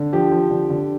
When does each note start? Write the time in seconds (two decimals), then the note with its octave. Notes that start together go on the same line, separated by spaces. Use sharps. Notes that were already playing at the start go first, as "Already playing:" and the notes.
Already playing: D3
0.13 F3 G4
0.31 F3
0.50 D3
0.70 D3